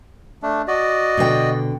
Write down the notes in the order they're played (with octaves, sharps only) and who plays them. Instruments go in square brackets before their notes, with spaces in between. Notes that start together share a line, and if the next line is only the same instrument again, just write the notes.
[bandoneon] A3 D4
F#4 D5 D#5
[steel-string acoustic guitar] B2 D3 G5